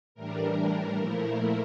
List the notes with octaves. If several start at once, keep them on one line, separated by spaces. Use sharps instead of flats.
A2 E3 G3 D4 A#4
A#2 F3 A3 E4